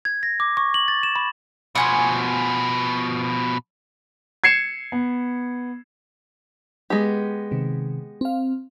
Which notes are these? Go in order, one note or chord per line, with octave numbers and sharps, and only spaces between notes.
G#6
A#6
D6
C#6
F#7
A6
E7
B5
B2 F3 F#5 G#5 C6
G#6 C7 C#7 E7
B3
G#3 B3 G4
C3 D#3
C4 F5